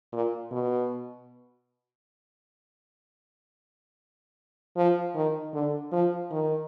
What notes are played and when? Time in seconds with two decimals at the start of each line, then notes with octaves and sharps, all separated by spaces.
0.13 A#2
0.51 B2
4.77 F3
5.15 D#3
5.54 D3
5.92 F3
6.31 D#3